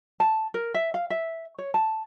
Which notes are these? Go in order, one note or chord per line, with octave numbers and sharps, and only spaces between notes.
A5
A#4
E5
F5
E5
C#5
A5